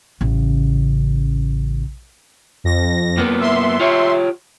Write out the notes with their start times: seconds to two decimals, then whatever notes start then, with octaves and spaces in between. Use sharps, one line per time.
0.21 A1 C#3
2.64 F2 A#6
3.17 F#2 A#3 B3
3.39 E5 C6
3.80 F4 G4 C#5